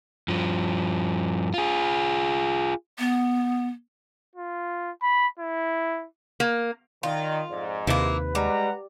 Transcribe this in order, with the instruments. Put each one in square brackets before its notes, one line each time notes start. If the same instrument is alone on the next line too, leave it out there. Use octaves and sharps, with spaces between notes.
[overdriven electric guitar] G2 F3
F4 G#4
[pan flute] B3
[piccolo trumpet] F4
B5
E4
[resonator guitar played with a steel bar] A#3
[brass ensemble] D#3 [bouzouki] F4 [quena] D5
[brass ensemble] F2 G#2 [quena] D5
[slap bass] D#2 C3 [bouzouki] A#3 E4 [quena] B4
[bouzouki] G3 [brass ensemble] G#3 F#5 A#5